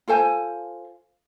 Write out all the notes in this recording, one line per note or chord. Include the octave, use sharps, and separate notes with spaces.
F4 A4 C5 G#5